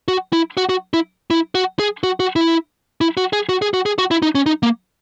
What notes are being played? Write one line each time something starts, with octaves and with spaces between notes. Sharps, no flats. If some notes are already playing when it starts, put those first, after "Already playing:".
F#4
E4
F#4
F#4
E4
E4
F#4
G#4
F#4
F#4
E4
E4
F#4
G#4
F#4
G#4
F#4
G#4
F#4
E4
D#4
C#4
D#4
A#3